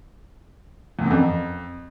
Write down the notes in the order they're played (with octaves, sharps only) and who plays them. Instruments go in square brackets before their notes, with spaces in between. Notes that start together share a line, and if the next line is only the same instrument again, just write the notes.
[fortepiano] E2
F#2
F2